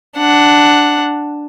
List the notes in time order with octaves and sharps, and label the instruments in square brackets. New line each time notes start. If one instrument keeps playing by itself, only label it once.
[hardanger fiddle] D4 F#5